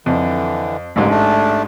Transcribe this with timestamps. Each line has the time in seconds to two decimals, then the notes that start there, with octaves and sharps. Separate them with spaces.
0.06 F2 D3 E3
0.96 A1 G#2 D3 A#3
1.10 A3 D4